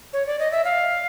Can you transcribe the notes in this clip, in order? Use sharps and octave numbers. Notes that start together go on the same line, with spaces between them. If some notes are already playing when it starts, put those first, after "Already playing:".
C#5
D5
D#5
E5
F5